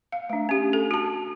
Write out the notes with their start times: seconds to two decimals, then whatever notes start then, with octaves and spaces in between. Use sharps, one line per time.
0.12 F5
0.30 A3 D4
0.49 C#4 G4
0.73 A4
0.91 F#4 A5